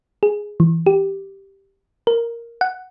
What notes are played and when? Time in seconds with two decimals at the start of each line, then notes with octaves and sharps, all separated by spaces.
0.23 G#4
0.60 E3
0.86 G4
2.07 A#4
2.61 F#5